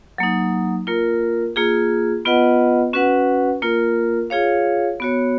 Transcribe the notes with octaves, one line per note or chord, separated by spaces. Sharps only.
F#3 A#3 D#4
A#3 F4 A#4
A#3 F4 G#4
B3 F4 B4 D#5 F#5
C#4 F#4 B4 F#5
A#3 F4 A#4
F4 G#4 C#5 F5
B3 F#4 C#5